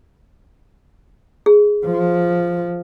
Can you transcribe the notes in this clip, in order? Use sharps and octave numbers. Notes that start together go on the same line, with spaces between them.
G#4
F3